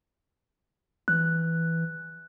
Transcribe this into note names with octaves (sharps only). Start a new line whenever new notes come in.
E3 F#6